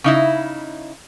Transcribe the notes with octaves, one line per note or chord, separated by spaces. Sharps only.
C#3 D#4 E4